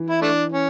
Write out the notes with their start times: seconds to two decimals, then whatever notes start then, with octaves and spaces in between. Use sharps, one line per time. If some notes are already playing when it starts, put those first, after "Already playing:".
Already playing: E3
0.09 E4
0.22 A3 D4
0.52 C#4